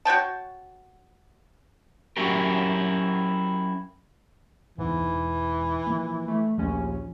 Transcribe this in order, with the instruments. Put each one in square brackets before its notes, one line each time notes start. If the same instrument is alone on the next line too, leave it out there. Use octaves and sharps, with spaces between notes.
[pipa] F#4 C#5 G5 A5
[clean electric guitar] F#3 C#4 E4 F#4 G4 A#4
[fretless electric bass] F#1 E2 [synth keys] G#2 [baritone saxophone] E3
[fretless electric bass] E1
F3 A#3
[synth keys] A3
[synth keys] A#1 D#2 C#4 [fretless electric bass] F3